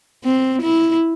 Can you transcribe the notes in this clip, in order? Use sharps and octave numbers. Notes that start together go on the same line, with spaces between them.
C4
E4